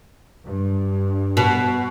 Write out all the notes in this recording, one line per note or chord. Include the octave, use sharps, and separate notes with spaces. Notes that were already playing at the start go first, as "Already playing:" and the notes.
G2
B2